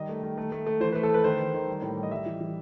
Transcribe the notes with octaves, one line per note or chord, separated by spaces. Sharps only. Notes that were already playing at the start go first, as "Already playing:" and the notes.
Already playing: D#3 G3 D#5
A3
D#3
A3
A3
A3
E3 C5
B4
A3
A4
A3 B4
D#3 C5
D#3
D#3
G3
A2
G3
D#5
G3 E5
E3
E3